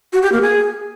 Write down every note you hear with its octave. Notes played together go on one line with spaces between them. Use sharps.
F#4
G4
A#3
G#4